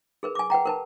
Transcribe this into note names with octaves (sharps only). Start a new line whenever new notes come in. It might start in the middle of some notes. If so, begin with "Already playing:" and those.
G#4 A#4 B4
G#5 D6
B4 F#5 G5 A#5
A#4 B4 A5